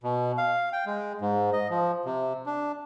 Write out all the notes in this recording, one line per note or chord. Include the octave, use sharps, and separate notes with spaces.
B2
F5
G5
G#3
G#2
D#5
F3
C3
D4